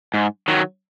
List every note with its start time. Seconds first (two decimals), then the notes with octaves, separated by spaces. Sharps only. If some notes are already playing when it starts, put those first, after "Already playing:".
0.14 G#2
0.48 D#3 F#3